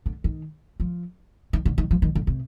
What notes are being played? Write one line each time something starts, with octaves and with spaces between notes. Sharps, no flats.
D3
D#3
F3
D#3
D3
D#3
F3
D#3
D3
C3